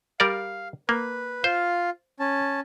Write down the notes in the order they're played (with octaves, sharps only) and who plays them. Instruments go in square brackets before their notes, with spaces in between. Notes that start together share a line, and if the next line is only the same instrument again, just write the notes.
[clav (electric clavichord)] G3 A#4 D5 [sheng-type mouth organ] F5
[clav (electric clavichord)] A#3 [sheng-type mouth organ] B4
[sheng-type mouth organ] F4 F5 [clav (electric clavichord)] C5
[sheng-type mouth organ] C#4 A5